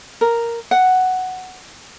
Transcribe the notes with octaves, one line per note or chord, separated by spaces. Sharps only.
A#4
F#5